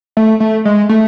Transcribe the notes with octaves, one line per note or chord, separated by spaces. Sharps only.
A3
A3
G#3
A3